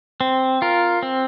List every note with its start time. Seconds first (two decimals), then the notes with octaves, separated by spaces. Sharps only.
0.21 C4
0.62 F4 A#4
1.03 C4